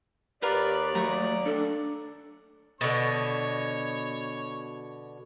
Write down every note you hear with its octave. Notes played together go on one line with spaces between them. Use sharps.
D#2 F4 G4 A#4 B4 D5
F#3 A3 A#5 C#6
D4 A4
B2 D3 C#5